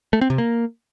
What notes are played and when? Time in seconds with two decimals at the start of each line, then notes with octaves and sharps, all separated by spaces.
0.13 A3
0.21 C4
0.30 C3
0.38 A#3